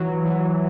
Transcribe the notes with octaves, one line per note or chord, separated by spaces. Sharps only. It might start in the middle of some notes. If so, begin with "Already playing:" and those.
Already playing: E3 F#3
E3